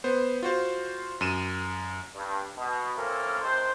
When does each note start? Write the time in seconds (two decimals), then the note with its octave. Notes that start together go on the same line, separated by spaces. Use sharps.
0.04 B3 C5
0.43 F4 F#4 C5
1.21 F#2 D#7 E7
2.15 G2
2.57 B2
2.96 A#3 C4 C#4 E4 A4 A#4
3.42 C3 D#3 D4 C5